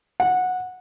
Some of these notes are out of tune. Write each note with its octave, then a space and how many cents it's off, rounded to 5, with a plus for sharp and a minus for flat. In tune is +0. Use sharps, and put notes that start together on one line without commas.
F#5 -15